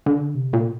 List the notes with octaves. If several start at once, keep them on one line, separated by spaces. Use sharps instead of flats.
D3
C3
A#2